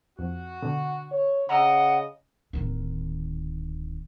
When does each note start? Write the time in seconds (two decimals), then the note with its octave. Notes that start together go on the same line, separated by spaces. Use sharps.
0.19 F2 F#4
0.62 B2 D3
1.11 C#5
1.49 C#3 D#5 F#5 A#5 E6
2.53 D1 D#3